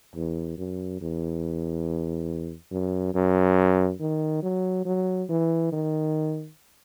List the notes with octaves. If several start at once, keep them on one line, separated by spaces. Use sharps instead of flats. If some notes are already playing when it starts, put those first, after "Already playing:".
E2
F#2
E2
F#2
F#2
D#3
F#3
F#3
E3
D#3